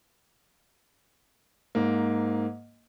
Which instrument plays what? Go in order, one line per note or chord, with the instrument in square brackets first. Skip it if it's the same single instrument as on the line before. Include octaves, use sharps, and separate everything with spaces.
[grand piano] G#2 A#3